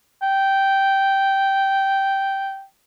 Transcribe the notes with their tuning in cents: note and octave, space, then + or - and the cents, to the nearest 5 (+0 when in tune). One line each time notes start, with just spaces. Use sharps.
G5 -10